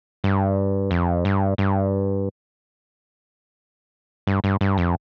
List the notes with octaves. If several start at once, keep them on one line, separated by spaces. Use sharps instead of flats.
G2
F2
G2
G2
G2
G2
G2
F2